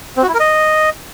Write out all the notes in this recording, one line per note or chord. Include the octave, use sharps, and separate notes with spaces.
C4
F#4
E4
A#4
D#5